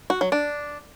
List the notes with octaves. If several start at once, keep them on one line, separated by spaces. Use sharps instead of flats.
F#4
F#3
D4